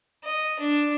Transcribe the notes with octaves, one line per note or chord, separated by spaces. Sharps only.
D#5
D4